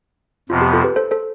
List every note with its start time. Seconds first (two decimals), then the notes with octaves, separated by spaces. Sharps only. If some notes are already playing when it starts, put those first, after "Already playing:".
0.49 F2 C3 F3 B3 F4
0.61 G4
0.73 F4 A4
0.84 G4 B4
0.96 A4 C5
1.11 A4 C5